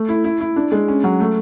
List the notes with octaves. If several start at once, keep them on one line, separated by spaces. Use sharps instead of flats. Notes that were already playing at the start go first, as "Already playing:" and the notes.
Already playing: A3
E4
E4
E4
D4
G#3
C#4
F#3
A3